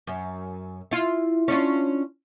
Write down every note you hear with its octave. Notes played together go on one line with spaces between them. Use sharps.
F#2
E4 F4
C#4 D4 F4